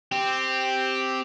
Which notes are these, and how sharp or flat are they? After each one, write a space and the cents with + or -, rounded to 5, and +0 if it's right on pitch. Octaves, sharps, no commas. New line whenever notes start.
C4 +0 G4 +0